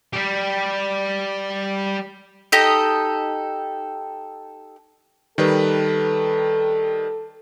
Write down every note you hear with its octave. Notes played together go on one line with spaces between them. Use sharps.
G3 G4
D#4 G4 A4 D#5
D#3 G3 A4 B4